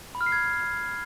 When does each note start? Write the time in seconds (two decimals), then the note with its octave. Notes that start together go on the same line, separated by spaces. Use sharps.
0.15 B5
0.21 F6
0.26 C7
0.32 G#6